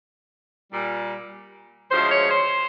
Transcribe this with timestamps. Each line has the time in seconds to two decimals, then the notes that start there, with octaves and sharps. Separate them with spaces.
0.72 A#2 G3
1.91 D2 C#3 F3 G#3 C5
2.10 C#5
2.30 C5